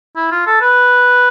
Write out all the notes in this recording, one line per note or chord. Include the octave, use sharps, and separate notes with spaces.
E4
F4
A4
B4